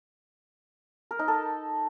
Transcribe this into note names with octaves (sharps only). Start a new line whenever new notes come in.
A#4
D#4
A4